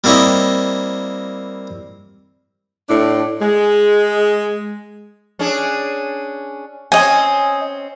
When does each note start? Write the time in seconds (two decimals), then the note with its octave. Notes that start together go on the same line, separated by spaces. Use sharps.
0.04 G3 A#3 C4 E4 C#5 D#5
2.89 A2 D4 E4
3.41 G#3
5.39 C#4 D4 G#4
6.92 C4 C#4 D#5 G#5